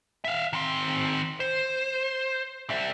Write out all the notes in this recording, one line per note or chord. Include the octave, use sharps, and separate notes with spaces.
E5 F5
D#3 C4
C5
G3 E5